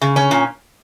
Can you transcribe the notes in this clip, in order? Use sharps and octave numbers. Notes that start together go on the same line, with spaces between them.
C#3
C#4
A#2